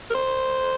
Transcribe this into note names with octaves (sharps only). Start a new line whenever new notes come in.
A#4
C5